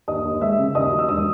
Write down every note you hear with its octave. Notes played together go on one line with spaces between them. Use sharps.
D#2 D#5 D#6
D#2
G#3 E5 E6
C#3
D#2 D#5 D#6
F#3
E6
E1 D#5 D#6